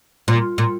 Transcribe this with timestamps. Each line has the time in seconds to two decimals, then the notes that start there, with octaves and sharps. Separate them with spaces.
0.28 A#2
0.58 A#2